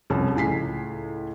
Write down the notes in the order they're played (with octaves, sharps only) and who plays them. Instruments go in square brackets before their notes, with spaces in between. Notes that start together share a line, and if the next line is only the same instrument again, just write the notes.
[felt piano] C2 F2 C#4 A5
C#2 A2 G#5 B6 C7